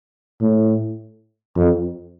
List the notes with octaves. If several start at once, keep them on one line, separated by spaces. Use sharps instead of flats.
A2
F2